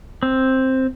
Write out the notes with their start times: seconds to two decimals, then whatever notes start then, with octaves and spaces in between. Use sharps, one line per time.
0.23 C4